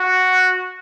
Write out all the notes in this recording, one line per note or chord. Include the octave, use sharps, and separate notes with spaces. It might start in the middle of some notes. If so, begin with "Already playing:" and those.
Already playing: F#4